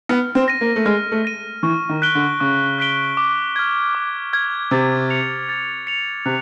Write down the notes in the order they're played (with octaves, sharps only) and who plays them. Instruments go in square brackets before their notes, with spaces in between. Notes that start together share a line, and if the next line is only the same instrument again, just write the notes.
[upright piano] B3 [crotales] F6
[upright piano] C4
[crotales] A#6 D#7
[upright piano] A#3
A3
[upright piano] G#3 [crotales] F6
[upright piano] A3
[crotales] A#6 D#7
[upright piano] E3 [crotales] C#6
[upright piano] D#3
[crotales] F#6 B6 D7 G7
[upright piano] D3
[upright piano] C#3 [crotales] C#6
[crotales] F#6 B6 D7 G7
D6
F6 G#6
D6
F6 G#6
[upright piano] C3 [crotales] A6
[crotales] C#7 F7
A6
C#7 F7
[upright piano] C3 [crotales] F#6